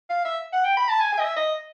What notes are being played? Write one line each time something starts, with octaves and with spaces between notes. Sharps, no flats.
F5
E5
F#5
G5
B5
A5
G#5
G#5
D#5
E5
D#5